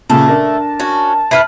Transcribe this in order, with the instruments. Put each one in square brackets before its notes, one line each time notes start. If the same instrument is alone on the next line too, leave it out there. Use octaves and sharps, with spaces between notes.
[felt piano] A#2 C#3 [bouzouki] A3 [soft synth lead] A5
[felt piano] D4 A#4
[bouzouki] C#4 F#4
[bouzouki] E4 B4 F#5 [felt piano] F6 C7